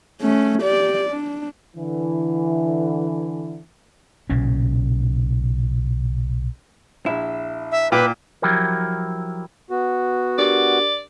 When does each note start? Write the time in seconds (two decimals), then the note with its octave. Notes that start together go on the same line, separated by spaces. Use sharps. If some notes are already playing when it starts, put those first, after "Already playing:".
0.21 A3 C#4
0.62 G4 D5
1.10 D4
1.76 D3 E3
4.30 B1 A#2 C#3 C#4
7.06 A#1 E4
7.72 E5
7.92 A#2 B4 G5 D6
8.42 F3 F#3 E4 G4 A#4
9.71 B3 F#4
10.38 D4 G4 A#4 D5